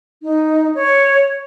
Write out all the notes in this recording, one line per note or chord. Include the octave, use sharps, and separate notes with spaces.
D#4
C#5